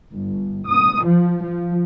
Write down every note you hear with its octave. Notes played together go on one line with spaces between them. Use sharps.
G1
D#6
F3
F3